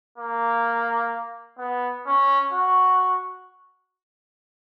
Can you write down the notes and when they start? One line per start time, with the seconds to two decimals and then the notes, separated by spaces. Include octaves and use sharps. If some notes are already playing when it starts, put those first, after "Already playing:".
0.18 A#3
1.59 B3
2.06 C#4
2.52 F#4